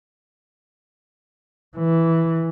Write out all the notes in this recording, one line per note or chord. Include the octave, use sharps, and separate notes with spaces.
E3